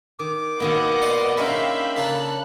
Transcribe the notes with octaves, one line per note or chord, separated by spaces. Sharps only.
D#3 D6
B2 D#3 A#3 B3 D#5 F#5
D5 C6
G#3 C#4 D4 A#4 E5 F5 G5 B5
C#3 A#3 A4 F#6